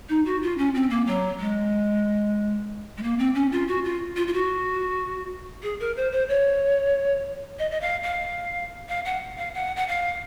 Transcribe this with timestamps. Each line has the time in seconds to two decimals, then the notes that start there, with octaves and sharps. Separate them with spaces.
0.09 D#4
0.25 F#4
0.42 F4
0.58 C#4
0.74 C4
0.90 A#3
1.07 F#3
1.40 G#3
2.97 G#3
3.03 A#3
3.18 C4
3.34 C#4
3.52 F4
3.68 F#4
3.84 F4
4.16 F4
4.27 F4
4.33 F#4
5.63 G#4
5.80 A#4
5.96 C5
6.12 C5
6.28 C#5
7.59 D#5
7.71 D#5
7.81 F5
8.03 F5
8.89 F5
9.05 F#5
9.38 F5
9.54 F#5
9.76 F#5
9.87 F5